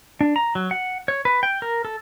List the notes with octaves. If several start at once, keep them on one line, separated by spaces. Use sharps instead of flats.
D4
A#5
F#3
F#5
C#5
B4
G5
A#4
A4